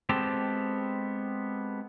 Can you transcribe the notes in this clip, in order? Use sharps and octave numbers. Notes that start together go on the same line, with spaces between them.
G#3 B3 C4 G4 A4